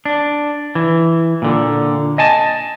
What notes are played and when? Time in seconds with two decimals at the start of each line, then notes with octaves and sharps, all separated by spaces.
0.05 D4
0.75 E3
1.42 A#2 D3
2.18 D#5 G#5 A5